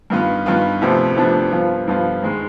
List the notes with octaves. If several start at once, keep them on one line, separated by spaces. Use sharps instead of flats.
G2 D#3 B3 F4 B4
G2 D#3 B3 F4 B4
D2 C3 F3 B3 D4
D2 C3 F3 B3 D4
G2 F3 B3 F4
G2 F3 B3 F4
G#2 D#3 G#3